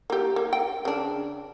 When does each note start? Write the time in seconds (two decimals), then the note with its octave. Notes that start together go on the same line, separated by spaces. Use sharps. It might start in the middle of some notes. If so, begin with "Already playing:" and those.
0.10 A#3 G4
0.36 A#3
0.53 G5
0.85 C#3 D4